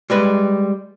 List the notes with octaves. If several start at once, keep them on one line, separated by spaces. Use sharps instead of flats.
G3 G#3 B4